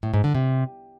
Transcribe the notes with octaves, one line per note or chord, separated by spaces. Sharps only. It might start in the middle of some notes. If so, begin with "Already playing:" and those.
A2
G#2
D3
C3